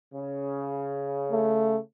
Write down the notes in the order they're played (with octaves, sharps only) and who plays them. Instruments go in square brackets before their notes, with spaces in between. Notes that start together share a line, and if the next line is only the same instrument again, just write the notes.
[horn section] C#3
[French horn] A3